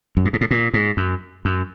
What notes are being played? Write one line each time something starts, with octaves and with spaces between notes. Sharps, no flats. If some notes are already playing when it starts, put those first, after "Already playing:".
F#2
G2
G#2
A2
A#2
G#2
F#2
F#2